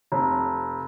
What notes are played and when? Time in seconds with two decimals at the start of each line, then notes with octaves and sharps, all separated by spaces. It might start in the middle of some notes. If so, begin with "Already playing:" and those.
0.12 F1